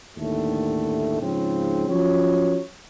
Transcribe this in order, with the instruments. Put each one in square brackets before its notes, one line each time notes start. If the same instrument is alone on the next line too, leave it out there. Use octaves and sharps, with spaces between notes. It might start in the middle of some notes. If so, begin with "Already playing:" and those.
[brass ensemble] D#2 A2 D3 A3
G#2 C#3 F3 C4
F3 F#3 C#4 C#5